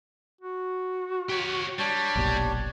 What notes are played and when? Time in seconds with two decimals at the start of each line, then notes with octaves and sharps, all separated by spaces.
0.41 F#4
1.29 G4 C#5
1.79 G3 D4 C#5
2.15 F#1 B1 A#2 G4